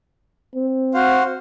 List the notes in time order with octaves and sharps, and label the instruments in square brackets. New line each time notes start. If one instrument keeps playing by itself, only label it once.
[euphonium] C4
[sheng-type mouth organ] F#4 C5 F5